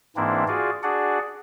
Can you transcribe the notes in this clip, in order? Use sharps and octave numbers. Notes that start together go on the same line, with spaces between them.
G#2 E3 A#3 C4 D4 E4
F4 F#4 G#4 D5
D4 F#4 G#4 D5 F#5